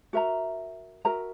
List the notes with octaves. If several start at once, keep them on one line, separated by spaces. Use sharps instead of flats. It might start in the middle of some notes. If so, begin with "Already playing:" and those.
F#4 A#4 E5 A#5
F#4 A#4 E5 A#5